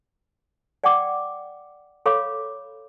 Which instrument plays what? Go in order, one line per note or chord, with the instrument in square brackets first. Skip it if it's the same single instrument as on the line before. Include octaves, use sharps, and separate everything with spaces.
[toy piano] D5 F#5 G5 D6
A4 C#5 F5 B5 C6 D6